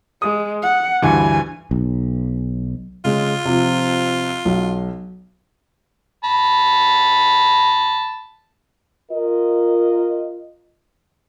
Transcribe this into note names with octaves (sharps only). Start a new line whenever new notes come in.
G#3 D#6
F#5
D2 G2 E3 G#5
B1
C#3 G#3 F4
C3 F3
B1
A5 B5
F4 A#4 D#5